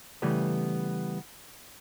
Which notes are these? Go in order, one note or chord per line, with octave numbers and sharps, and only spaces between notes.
C#3 E3 G3 A3 B3